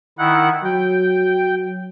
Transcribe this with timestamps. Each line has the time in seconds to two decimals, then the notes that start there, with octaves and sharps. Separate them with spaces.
0.18 D#3 E4 F#5
0.64 F#3 G5